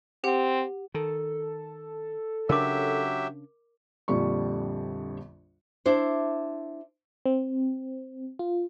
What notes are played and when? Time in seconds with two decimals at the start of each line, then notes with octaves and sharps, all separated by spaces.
0.24 C4 G4 F#5
0.94 D#3 A4
2.49 C#3 F#3 D4 G4 A#4 E5 D6
4.08 A#1 F2 D3 G3 D5 C#6
5.86 D4 E4 C5
7.26 C4
8.39 F4